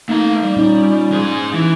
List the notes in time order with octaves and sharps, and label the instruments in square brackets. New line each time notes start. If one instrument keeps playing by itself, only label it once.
[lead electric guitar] A3 A#5 [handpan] A#3 D#4
[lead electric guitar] G3
[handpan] A#2 C#4 D#4
[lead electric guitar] G#2 G#4
E3